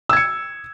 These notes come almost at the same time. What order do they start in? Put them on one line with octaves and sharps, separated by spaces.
E6 G#6 C#7